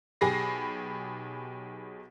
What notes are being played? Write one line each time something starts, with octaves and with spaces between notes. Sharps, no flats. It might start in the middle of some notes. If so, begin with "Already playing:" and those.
B1 G4 G#4 B5 A#6 C7